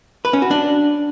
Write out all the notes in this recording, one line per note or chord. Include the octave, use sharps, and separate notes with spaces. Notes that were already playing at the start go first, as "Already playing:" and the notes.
B4
C#4
F#4
D4